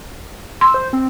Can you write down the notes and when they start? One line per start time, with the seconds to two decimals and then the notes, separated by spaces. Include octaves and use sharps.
0.61 C6 E6
0.74 C5
0.93 C4